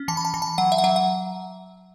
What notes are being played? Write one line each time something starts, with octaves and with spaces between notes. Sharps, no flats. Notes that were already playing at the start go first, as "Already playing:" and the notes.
Already playing: C#4
E3 A5
B5
A5
E3 B5
A5
F#3 F#5
E5
F#5
F#3 E5
F#5